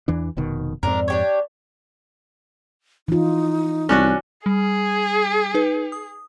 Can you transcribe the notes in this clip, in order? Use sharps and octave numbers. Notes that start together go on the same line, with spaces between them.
E2 E3 D4
F1 B2 D#3
F2 G#2 C4 D4 A#4
D4 G4 C#5
E3 D#4 F4
C2 C#4 D4 F#4
G3 G#4
D#4 B4
D#6